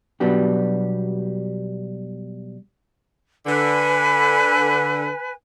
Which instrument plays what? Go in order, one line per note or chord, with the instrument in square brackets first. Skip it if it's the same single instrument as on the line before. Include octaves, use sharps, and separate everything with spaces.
[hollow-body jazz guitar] B2 F#3 G3 B3 D4 G4
[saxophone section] D3 [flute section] B4 G#5